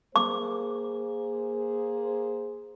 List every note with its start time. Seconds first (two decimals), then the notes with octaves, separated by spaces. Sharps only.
0.16 A#3 G#4 C5 D6